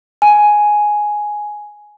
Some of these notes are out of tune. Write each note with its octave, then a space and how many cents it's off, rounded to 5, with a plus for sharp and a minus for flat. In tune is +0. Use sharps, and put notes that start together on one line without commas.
G#5 +5